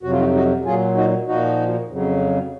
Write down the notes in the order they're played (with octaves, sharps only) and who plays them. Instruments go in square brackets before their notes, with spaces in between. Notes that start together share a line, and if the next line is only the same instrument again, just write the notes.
[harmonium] F2 C3 F#3 F#4
F4
D#4 F#4
D#4 F#4
A#2 F#3 F4 G#4
D#4 F#4
A#2 F3 D#4 F#4
F2 C#3 F#3